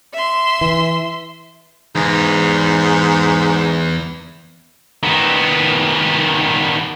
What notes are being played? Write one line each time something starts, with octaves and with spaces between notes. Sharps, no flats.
E5 C6
E3
E2 G#2
D#3 B3